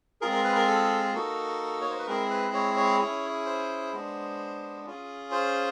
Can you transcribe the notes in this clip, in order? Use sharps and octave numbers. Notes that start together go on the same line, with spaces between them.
G#3 C4 F4 G#4 A#4
A#4
B4
A#4
A4
A#3 D#4 F#4 A4
C#5
C5
B4
G#3 C4 E4 G#4 A#4
B4
C#5
C#5
C#4 E4 G#4
C5
G#3 B3 D4
C#4 F4 G#4
C5